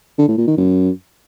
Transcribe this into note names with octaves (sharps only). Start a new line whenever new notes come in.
D3
A2
A#2
D#3
F#2